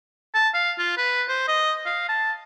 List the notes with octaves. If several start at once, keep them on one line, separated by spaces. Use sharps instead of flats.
A5
F5
F4
B4
C5
D#5
F5
A5